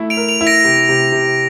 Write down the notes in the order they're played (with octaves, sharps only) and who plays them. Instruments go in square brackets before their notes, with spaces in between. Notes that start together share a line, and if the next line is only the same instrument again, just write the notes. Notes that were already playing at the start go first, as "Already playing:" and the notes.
Already playing: [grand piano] A3 E4
[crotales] D7 F7
[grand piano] A#4
[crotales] D7 F7
[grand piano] E4
[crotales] A#6 D7
[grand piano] C3
C3
C3